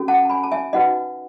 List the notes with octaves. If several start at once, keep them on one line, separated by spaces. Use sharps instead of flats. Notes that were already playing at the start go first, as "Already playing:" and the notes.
Already playing: C#4 F#4 A4
F#5 A5
A5
G#5 B5
A5
E5 G#5
D#4 F#4 B4 D#5 F#5